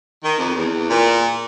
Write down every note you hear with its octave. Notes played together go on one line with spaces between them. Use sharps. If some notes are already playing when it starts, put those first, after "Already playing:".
D#3
F2
E2
A#2